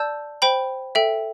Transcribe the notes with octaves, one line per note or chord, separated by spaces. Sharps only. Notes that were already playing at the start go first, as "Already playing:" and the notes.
Already playing: D5 A5 E6 G6
C5 G5 B5
A4 E5 G5